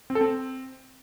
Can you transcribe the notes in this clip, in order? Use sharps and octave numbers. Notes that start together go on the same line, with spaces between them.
C4
A4
C4